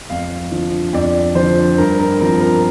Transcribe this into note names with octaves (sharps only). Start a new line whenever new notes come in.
F2 F5
D3 F3
F2 D5
D3 F3 C5
G2 A#4
A#4
F3 C4 A#4
A#4